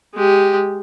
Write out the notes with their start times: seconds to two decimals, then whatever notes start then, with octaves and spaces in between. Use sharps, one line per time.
0.15 G#3 G4